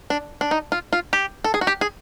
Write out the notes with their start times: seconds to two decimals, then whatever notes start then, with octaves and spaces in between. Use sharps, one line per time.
0.10 D4
0.41 D4
0.51 D#4
0.72 F4
0.93 F4
1.13 G4
1.44 A4
1.54 G#4
1.61 F#4
1.67 G4
1.81 G#4